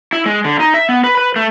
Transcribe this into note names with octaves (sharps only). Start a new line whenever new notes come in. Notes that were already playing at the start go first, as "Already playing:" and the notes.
E4
G#3
D3
D#4
E5
B3
B4
B4
A3